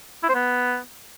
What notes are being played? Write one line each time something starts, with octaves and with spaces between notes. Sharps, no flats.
E4
C5
B3